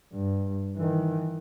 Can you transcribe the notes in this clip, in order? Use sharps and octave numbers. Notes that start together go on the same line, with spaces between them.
G2
D#3 E3